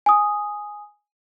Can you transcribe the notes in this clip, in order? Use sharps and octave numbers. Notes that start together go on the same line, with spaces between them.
G#5 D#6